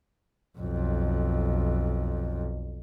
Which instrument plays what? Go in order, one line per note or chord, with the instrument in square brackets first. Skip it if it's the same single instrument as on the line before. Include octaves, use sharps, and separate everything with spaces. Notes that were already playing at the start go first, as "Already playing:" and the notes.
[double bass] B1 F2